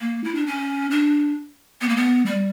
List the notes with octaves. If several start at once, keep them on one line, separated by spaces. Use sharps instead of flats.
A#3
E4
D4
C#4
D4
B3
A#3
B3
G3